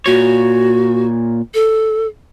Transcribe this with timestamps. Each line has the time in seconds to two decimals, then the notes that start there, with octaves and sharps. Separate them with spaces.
0.06 A#2 F#4 C#5
1.54 A4